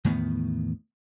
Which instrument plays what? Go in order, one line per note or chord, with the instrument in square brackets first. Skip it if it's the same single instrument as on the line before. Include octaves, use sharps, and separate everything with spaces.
[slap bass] E2 A2 D#3 B3